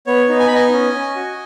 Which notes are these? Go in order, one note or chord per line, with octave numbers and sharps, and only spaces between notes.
B3 C#5
D#4
G#5
B5
B3 D#5 G#5
C#4
C#4
F#4